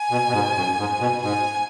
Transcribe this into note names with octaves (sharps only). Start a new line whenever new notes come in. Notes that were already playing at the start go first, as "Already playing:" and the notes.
Already playing: G#5
B2
B2
G#2
F#2
G#2
B2
G#2 G#5